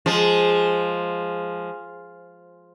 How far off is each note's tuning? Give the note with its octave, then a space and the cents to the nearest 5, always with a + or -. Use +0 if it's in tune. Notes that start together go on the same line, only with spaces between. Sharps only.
F3 +0 G#3 +0